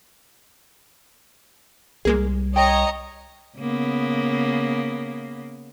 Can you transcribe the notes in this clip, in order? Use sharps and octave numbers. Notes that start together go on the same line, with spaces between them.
C2 G3 G#3 A#3 G#4
C#5 D#5 G5 A#5
C#3 A#3 B3